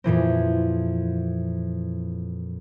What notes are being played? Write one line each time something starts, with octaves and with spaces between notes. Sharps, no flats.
F2 A#2 E3 C4